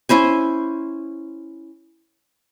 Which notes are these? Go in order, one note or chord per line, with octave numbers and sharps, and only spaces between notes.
C#4 E4 C5 G#5